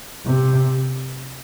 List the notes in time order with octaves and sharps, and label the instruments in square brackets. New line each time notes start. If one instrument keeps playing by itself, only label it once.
[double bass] C3